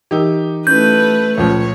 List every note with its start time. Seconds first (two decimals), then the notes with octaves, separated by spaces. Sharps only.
0.11 E3 D#4 G4 A#4 E6
0.67 A3 C#4 E4 B4 G6
1.38 C#2 A#2 F3 A3 F4 C#5